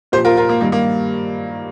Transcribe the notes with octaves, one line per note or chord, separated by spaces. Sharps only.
A#2 F3 G4 C5
F4 A#4
F4 A#4
A#3
G2 D#3 G3 A#3
A#3